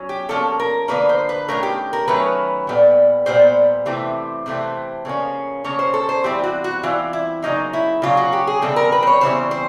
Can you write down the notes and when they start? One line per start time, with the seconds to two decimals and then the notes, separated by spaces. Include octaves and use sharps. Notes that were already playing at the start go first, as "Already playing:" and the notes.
Already playing: F#3 C#4
0.09 G4
0.29 D3 F3 A#3 C#4 A4
0.60 A#4
0.88 D3 F3 A#3 C#4 B4
1.09 C5
1.29 B4
1.48 D#3 F#3 A3 C#4 A#4
1.63 G4
1.93 A#4
2.08 D#3 F#3 A3 C#4 B4
2.67 A#2 G3 B3
3.26 A#2 G3 B3 C5
3.86 C3 E3 A3 C4
4.46 C3 E3 A3 C4
5.05 C#3 F3 A#3 C#4
5.64 C#3 F3 A#3 C#4 C#5
5.79 C5
5.94 A4
6.09 C5
6.24 E3 G3 C4 G4
6.44 F#4
6.64 F#4
6.83 E3 G3 C4 F4
7.13 E4
7.42 C#3 F#3 A#3 D#4
7.73 E4
8.02 C#3 F#3 A#3 F4
8.17 F#4
8.33 G4
8.47 G#4
8.62 C#3 E3 G3 C4 A4
8.76 A#4
8.92 B4
9.02 C5
9.07 C#5
9.21 C#3 E3 G3 C4 C5
9.51 C5